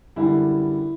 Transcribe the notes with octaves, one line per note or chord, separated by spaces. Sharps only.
F#2 D3 G3 E4